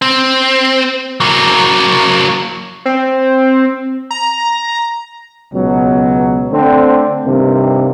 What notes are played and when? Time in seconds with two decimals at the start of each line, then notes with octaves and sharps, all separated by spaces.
0.02 C4
1.20 F#3 A#3
2.86 C4
4.11 A#5
5.53 C#2 B2 F#3
6.52 D3 A3 C4
7.25 G2 C3 D#3 G3 A#3